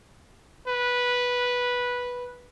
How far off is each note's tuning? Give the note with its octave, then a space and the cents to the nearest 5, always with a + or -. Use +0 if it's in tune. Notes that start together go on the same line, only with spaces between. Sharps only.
B4 -10